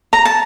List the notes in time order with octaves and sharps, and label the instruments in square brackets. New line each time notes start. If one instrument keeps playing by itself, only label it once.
[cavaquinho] A#5
A5